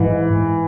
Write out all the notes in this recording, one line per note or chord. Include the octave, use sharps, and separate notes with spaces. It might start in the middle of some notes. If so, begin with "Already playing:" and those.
Already playing: G#2 E3